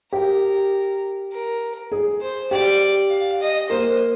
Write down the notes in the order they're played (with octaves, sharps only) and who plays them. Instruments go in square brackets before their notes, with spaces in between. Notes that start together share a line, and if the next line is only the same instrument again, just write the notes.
[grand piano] G4 [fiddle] A#4
[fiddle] A#4
[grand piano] G#4
[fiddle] C5
[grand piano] G4 [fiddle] D5
[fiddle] F5
D#5
[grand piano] A#3 [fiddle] C5